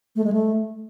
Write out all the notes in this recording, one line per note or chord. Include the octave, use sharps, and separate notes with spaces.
A3
G#3
A3